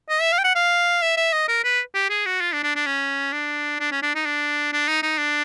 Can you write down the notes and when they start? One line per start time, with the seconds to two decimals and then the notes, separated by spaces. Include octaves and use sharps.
0.09 D#5
0.21 E5
0.32 F5
0.39 G5
0.44 F#5
0.55 F5
1.02 E5
1.17 E5
1.33 D#5
1.48 A#4
1.64 B4
1.94 G4
2.09 G#4
2.26 F#4
2.41 F4
2.53 D4
2.63 D4
2.76 D4
2.87 C#4
3.33 D4
3.80 D4
3.91 C#4
4.02 D4
4.15 D#4
4.26 D4
4.73 D4
4.88 D#4
5.02 D#4
5.18 D4